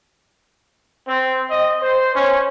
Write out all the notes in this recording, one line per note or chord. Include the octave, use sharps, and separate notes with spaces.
C4
D#5
C5
C#4